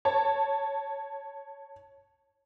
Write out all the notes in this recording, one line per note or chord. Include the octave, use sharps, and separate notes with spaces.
C#5 A5